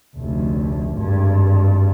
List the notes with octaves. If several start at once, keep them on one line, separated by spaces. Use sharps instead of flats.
F1 D2
G#1 G2